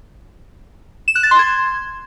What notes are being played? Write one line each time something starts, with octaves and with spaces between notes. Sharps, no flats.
E7
F#6
A6
C6
G#6